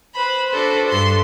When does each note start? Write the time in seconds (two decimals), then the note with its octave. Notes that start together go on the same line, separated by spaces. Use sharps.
0.14 B4 C5 B5
0.50 D4 F#4 A4 B4 C5
0.88 G2 A4 C6